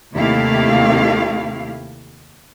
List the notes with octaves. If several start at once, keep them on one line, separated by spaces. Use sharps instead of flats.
D#2 C3 A3 E4 G4 F5